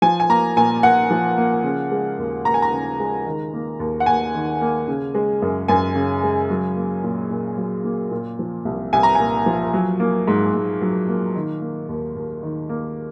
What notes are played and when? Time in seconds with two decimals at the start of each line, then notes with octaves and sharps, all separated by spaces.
0.02 F3 G#5
0.20 G#5
0.29 A#3 A#5
0.56 A#2 G#5
0.83 A#2 F#5
1.11 F3
1.38 A#3
1.64 C#3
1.92 G#3
2.19 D#2
2.45 D#2 A#5
2.54 G#5
2.62 A#5
2.72 C#3
3.00 G#3
3.26 D#3
3.54 A#3
3.80 D#2
4.00 F#5
4.06 D#2 G#5
4.35 D#3
4.61 A#3
4.88 C#3
5.15 G#3
5.42 F#2
5.68 F#2 G#5
5.95 C#3
6.23 G#3
6.50 F#3
6.76 A#3
7.03 A#2
7.30 A#2
7.58 F#3
7.84 A#3
8.11 A#2
8.39 F3
8.65 C2
8.93 C2 G#5
9.03 A#5
9.15 A#2 G#5
9.46 F3
9.74 F#3
10.00 A#3
10.28 G#2
10.54 G#2
10.82 F#3
11.08 A#3
11.36 D#3
11.61 A#3
11.89 D#2
12.17 D#2
12.43 D#3
12.69 A#3